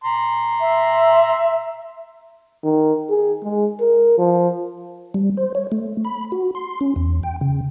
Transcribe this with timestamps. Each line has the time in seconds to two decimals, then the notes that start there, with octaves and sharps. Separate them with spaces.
0.04 A#5 C6
0.60 E5
2.64 D#3
3.10 G#4
3.43 G#3
3.80 A#4
4.18 F3
5.14 G3
5.37 C5
5.55 C#5
5.72 A3
6.05 B5
6.32 F#4
6.55 C6
6.81 C#4
6.96 E2
7.23 G5
7.41 C#3